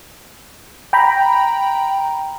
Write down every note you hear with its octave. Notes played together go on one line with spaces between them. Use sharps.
G5 A#5 B5